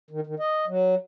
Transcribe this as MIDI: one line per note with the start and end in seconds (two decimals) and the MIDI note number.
0.11 0.20 51
0.27 0.35 51
0.40 0.65 75
0.68 0.95 54